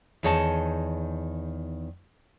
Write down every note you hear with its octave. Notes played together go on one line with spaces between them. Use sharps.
E2 D#3 G#4 C#5 D#5 A5